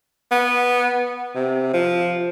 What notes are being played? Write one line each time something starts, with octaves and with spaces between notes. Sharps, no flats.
B3
C3
F3